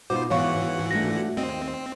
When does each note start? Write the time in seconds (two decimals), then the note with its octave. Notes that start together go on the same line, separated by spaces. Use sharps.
0.10 B2 D#4 F4 F#4 C5 D6
0.30 G#2 E3 B3 C#5 F5 F#5 C#6
0.91 A3 D4 F4 A#6
1.37 D#2 C4 D#5